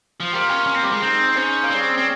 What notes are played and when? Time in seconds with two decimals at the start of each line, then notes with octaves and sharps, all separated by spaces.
0.20 F3
0.32 G3 A#3 F4 A#4
0.49 C#4
0.67 C#4
0.75 C4
0.84 G3
0.93 G#3
1.02 C4 D#4 G#4 C5
1.36 C#4
1.64 A#3
1.70 G3 C4 C#4 G#4 C#5
1.97 C4